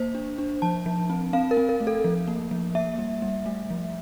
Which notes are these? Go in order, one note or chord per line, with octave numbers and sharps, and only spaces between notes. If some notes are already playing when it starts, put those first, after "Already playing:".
Already playing: A#3 C5
D4
D4
F3 A5
F3
C4
C4 F5
A#4
C4
A#4
A3
A4
F3
A#3
F3
A#3 E5
G3
G3
A3
F3